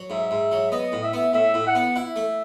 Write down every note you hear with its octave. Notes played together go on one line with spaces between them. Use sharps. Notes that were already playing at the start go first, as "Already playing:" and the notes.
Already playing: F#3
G#2 E5
G#2
F#3
B3 D#5
A2
E5
B3
A2 E5
A2
F#5
B3
E4 E5
A3